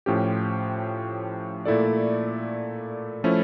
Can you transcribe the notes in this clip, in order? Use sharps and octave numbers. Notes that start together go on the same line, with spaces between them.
A2 F3 C#4 G4
A#2 A3 E4 A4 D5
F3 A3 C#4 E4